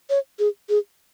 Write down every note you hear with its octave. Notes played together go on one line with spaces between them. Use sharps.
C#5
G#4
G#4